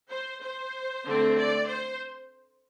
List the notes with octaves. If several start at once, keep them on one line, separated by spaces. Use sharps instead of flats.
C5
C5
D3 A3 C4
D5
C5